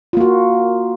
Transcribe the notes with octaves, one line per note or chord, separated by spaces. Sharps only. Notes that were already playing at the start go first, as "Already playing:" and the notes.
A#3 F4 F#4